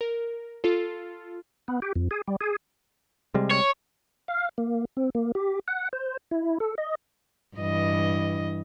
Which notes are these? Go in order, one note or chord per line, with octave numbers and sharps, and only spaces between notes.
A#4
F4 A4
B3
G4
F2
G#4
G3
G#4
C3 G3 G#3
C#5
F5
A#3
C4
A#3
G4
F#5
C5
E4
A4
D#5
G2 E3 D#5